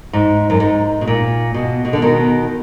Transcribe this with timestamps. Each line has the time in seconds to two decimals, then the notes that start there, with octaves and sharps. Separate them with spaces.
0.13 G#2
0.50 F#2
0.60 G#2
1.01 B2
1.07 A#2
1.54 B2
1.85 B2
1.93 D3
2.02 B2 D#3